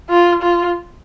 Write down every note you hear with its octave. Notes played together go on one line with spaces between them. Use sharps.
F4
F4